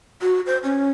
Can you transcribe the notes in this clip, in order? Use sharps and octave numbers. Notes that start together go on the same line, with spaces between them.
F#4
C5
C#4